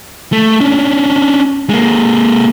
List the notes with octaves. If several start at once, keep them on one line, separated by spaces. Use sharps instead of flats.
A3
C#4 D4
G#3 A#3